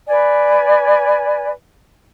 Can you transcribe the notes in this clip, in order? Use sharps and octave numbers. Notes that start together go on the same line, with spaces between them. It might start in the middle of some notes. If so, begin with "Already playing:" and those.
B4 D5 G#5